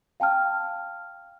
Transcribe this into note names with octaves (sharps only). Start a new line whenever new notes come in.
F5 G5 A5 F6